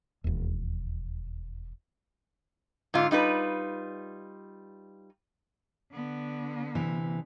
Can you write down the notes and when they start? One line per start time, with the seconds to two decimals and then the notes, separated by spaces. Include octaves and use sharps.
0.24 E1 D#2
2.94 G#2 D3 F4
3.11 G3 D#4 F4 B4
5.91 D3 B3
6.75 C3 E3